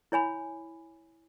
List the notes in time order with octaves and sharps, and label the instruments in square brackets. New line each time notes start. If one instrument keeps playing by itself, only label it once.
[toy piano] E4 C#5 G#5 B5